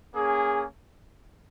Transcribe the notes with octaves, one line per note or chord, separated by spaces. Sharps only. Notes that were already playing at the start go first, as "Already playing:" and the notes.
A#3 C#4 G#4